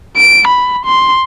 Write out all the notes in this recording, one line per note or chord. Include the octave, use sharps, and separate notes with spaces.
D7
B5
C6